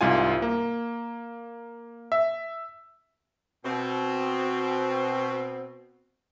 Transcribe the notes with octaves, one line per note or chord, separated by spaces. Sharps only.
C2 G#2 F4 G#5
A#3
E5
B2 C4